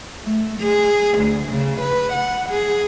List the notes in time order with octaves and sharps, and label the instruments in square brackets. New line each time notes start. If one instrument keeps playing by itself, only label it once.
[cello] A3
G#4
D2
C#3
B4
F#5
G#4